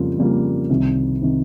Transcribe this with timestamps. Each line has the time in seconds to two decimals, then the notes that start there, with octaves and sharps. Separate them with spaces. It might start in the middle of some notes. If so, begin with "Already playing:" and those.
Already playing: F2 C#3 G3 A#3 F4
0.18 F2 C#3 G3 A#3 F4
0.69 C2 C3 D#3
1.22 C3 D#3